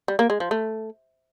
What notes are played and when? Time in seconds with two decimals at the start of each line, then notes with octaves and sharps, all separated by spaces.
0.08 G3
0.19 A#3
0.30 G#3
0.40 F3
0.51 A3